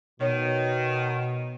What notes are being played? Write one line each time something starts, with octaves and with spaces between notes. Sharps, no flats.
B2 D#3 C#5